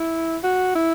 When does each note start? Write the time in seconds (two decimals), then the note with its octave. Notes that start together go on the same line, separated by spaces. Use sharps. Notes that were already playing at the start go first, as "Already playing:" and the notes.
Already playing: E4
0.43 F#4
0.75 E4